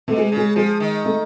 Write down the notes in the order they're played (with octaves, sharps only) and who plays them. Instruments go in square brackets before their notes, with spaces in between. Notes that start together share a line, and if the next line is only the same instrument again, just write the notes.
[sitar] B2 [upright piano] A3
[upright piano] G#3
[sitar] C#3 [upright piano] G#3
[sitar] F3 [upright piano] G#3
[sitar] D#3
[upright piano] A3